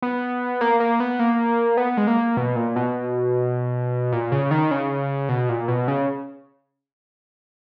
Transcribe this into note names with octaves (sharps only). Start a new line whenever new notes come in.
B3
A#3
A#3
B3
A#3
B3
G#3
A#3
B2
A#2
B2
A#2
C#3
D#3
C#3
B2
A#2
B2
C#3